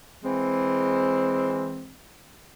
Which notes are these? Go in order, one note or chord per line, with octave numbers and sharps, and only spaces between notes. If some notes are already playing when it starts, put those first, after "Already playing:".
E3 G#3 C4